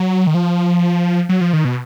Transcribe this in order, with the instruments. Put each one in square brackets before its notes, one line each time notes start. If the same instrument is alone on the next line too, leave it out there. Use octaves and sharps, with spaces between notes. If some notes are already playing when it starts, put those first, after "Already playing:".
Already playing: [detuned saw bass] F#3
D#3
F3
F#3
F3
D#3
B2